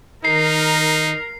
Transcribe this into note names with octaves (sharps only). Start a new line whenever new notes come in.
D#3 D#4 A#4 C7